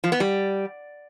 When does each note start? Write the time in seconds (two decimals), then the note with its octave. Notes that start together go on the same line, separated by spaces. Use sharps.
0.04 F3
0.12 B3
0.20 G3